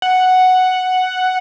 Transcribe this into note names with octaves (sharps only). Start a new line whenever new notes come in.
F#5